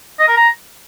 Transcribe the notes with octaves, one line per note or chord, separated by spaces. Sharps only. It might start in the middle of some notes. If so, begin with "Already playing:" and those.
D#5
A#4
A#5